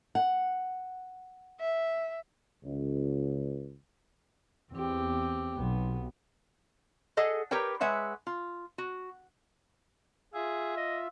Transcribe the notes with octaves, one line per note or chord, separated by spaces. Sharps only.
F#5
E5
C#2
E2 C4 G4
B1 B3
G#4 A4 D#5 F#5
G4 A#4 B4 C#5 G5
G#3 B4 C#5 E5 F#5
F4
F#4
F4 G#4 E5
D#5